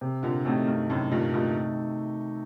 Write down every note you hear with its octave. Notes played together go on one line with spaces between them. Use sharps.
C3
A#2 D3
A2 C3 D#3 A3 D#4 F#4
G2
F#2 A2 C3
G2 A#2
G2 A#2 D#3 A3 D#4 F#4